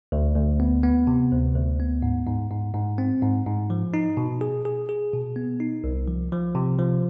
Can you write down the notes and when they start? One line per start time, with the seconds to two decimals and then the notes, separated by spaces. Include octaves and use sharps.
0.12 D2
0.36 D2
0.60 B3
0.84 B3
1.07 C3
1.32 D2
1.56 D2
1.80 B3
2.02 G#2
2.27 G#2
2.51 G#2
2.74 G#2
2.98 C4
3.22 G#2
3.46 G#2
3.70 F3
3.94 D#4
4.17 B2
4.41 G#4
4.65 G#4
4.89 G#4
5.13 B2
5.36 B3
5.60 D#4
5.84 C2
6.08 F3
6.32 F3
6.55 C3
6.79 F3